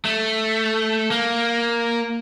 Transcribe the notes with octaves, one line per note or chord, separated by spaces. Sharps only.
A3
A#3